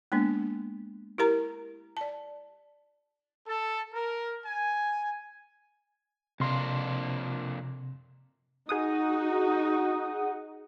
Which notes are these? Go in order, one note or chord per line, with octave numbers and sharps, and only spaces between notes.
G#3 A#3 B3 D4
E4 G4 A#4 A#5
D5 A5
A4
A#4
G#5
F2 C3 A#3 D4 C6
D#4 F#4 G#4 F#5 D#6